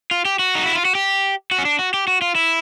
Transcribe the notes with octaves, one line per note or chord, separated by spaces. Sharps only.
F4
G4
F#4
D#4
E4
F4
F#4
G4
F#4
C#4
D4
F#4
G4
F#4
F4
E4